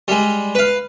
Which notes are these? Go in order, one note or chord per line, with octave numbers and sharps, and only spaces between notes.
G3 G#3
B4 F5